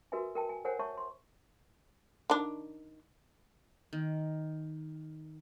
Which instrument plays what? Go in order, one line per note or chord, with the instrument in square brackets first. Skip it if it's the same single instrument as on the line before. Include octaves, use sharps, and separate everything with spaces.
[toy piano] F#4 A#4 B4 E5 G#5
A#4 G5 A5
G#5
A#4 C5 C#5 F#5 G#5
C#5 E5 A5 C#6
C6
[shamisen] D#3 D4
[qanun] D#3